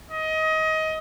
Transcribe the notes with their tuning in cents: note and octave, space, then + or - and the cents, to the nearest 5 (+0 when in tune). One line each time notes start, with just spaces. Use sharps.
D#5 +25